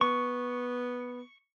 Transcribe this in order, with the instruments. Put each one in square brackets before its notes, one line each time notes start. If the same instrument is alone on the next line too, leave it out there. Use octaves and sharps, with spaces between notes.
[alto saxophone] B3 [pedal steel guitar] C#6